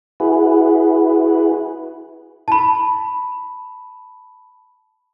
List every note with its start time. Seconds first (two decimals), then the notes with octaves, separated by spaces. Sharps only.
0.20 E4 F#4 G#4 B4
2.48 A5 B5